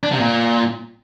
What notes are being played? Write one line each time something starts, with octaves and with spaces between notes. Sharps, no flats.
D4
C3
A#2